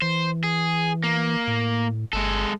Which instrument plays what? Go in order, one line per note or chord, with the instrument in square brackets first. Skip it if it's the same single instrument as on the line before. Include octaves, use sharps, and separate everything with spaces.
[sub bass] E3 [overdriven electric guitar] C5
[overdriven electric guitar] G#4
A#3
[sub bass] A2
[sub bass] G1 [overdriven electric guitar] G#3 A4